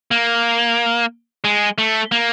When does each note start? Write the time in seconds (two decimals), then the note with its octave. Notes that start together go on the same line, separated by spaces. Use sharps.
0.11 A#3
1.44 G#3
1.78 A3
2.12 A#3